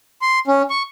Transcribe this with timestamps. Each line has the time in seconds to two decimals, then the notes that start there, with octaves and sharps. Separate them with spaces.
0.22 C6
0.47 C#4
0.70 C#6